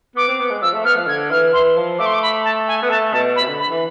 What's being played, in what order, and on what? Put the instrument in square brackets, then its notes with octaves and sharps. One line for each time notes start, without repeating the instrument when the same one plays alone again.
[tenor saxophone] B3 [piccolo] D6
[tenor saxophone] C4
B3
G#3
[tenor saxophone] F3 [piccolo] E6
[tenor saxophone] A3
[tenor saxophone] B3 [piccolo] F6
[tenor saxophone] F3
[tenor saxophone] D3 [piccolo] G#6
[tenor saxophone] E3 [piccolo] F6
[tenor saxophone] E3 [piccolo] C6
[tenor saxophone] F3
[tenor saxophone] A3 [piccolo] D6
[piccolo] C6
D6
B5
A5
G#5
[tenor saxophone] B3
[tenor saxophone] A3 [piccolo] A5
[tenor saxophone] B2 [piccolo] A5
[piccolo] B5
[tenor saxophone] C3
D3
[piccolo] B5
[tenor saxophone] E3